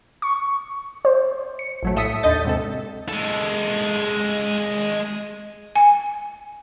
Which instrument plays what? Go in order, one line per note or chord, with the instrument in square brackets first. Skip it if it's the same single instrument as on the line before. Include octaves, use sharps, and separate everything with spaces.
[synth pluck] C#6
C5
[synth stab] C#7
A#1 F#3 A3
A2 A4 E5 D#6 B6 C#7
D#2 D3 A4 D#5 G6 A6
G#2 C3 A4
[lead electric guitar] G#3 A4
[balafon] G#5